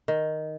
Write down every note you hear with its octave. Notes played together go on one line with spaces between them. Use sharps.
D#3